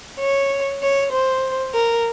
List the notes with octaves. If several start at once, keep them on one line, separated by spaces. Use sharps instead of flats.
C#5
C#5
C5
A#4